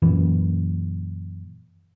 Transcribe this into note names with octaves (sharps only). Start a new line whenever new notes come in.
F#2 A#2 E3